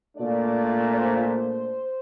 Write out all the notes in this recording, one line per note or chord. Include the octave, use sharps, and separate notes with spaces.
A#2 A3 D4 D5
C5